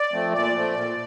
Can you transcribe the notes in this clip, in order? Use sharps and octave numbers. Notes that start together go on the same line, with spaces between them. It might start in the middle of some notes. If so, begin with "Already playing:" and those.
Already playing: D5
F3 A3 C4
A#2 D5
F3 A3 C4
A#2